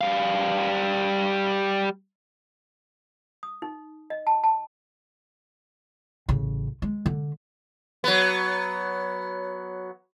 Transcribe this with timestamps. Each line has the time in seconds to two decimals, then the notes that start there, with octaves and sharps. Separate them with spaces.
0.01 G3 F5
3.43 D#6
3.62 D#4
4.10 D#5
4.27 A5
4.44 A5
6.29 A1 C#3
6.82 G#3
7.06 D3
8.04 F#3 B3